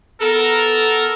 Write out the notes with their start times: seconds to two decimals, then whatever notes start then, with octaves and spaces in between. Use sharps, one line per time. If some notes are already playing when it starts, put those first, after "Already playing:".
0.21 B3 A4 A#4